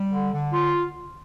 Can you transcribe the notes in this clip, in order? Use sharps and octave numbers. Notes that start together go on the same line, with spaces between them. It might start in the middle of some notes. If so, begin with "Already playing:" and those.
Already playing: G3
D3
D3
F4